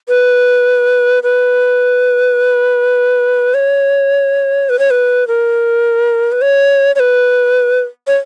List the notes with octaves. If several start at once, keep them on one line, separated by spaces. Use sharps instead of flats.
B4
B4
C#5
B4
C#5
B4
A#4
B4
C#5
C#5
B4
C#5